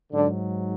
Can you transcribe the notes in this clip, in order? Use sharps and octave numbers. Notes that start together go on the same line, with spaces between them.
G#2 D3 F#3 D4